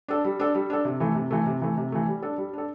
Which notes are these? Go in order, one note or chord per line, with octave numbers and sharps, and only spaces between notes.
D4 A4
G3
D4 A4
G3
D4 A4
C3
E3 A3
C3
E3 A3
C3
E3 A3
C3
E3 A3
G3
D4 A4
G3
D4 A4